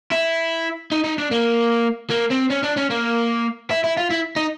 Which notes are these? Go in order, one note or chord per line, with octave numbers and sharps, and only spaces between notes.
E4
D#4
D#4
D4
A#3
A#3
C4
C#4
D4
C#4
A#3
E4
E4
F4
E4
D#4